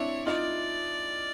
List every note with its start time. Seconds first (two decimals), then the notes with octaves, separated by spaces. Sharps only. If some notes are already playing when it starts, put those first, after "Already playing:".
Already playing: C4 D4 E4 C#5
0.26 D#4 F4 D5